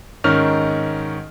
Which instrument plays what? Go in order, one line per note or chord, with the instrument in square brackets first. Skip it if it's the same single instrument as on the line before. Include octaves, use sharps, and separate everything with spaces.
[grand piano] G#2 D#3 C#4 F6